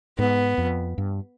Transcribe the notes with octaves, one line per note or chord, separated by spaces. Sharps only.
G#2 B3
F2
G2